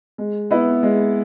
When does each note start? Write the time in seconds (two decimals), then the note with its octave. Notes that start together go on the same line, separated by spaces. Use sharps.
0.18 G#3
0.51 B3 E4
0.83 G#3